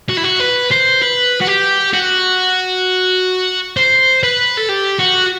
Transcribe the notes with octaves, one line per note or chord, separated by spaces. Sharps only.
F#4
E4
F#4
B4
C5
B4
F#4
G4
F#4
C5
B4
A4
G4
F#4